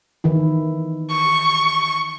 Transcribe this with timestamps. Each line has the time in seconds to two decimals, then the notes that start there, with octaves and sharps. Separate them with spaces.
0.24 D#3 E3 E4
1.12 C#6